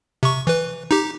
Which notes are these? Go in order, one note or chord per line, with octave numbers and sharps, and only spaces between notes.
C3 C#6
E3 B4
D#4 G4